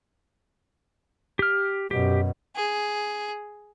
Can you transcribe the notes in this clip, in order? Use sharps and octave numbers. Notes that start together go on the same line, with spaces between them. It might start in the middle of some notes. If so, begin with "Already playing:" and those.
G4 F6
F#2 B2 G4
G#4